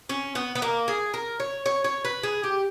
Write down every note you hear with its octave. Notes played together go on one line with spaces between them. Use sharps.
C#4
B3
B3
A#3
G#4
A#4
C#5
C#5
C#5
B4
G#4
G4